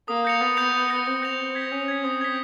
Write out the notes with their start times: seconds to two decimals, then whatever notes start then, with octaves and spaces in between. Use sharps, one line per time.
0.08 A#3 D#6
0.25 G6 A#6 C#7 F7
0.41 B3 D#6
0.57 G6 A#6 C#7 F7
0.73 D#6
0.90 G6 A#6 C#7 F7
1.06 C4 D#6
1.22 G6 A#6 C#7 F7
1.38 D#6
1.55 G#6 B6
1.72 C#4 D#6
1.88 G#6 B6
2.04 C4 D#6
2.21 G#6 B6